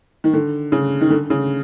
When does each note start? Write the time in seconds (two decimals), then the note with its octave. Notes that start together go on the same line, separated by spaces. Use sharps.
0.24 D#3
0.33 D3
0.72 C#3
1.01 D#3
1.10 D3
1.30 C#3